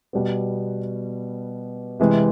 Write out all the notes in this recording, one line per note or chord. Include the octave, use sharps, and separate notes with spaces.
B2 G3 B3
C3 E3 G#3 C4